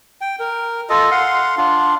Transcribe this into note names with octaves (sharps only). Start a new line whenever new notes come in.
G5
A#4
F4 A4 D#5
F5 F#5 C6
D4 F4